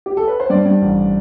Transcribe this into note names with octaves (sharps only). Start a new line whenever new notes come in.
G4
A4
B4
C5
G2 D5
G2
A1